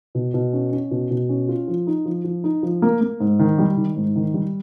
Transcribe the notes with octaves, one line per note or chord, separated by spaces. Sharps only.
B2
B2
C#4
C#4
B2
B2
C#4
F4
F3
D#4
F3
F3
D#4
F3
A#3
A#3
G#2
D#3
G3
D#3
G#2
D#3
G3